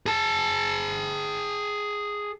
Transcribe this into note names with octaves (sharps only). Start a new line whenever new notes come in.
G#4 A5